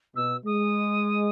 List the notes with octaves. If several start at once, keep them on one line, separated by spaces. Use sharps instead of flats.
B2 E6
G#3 D#6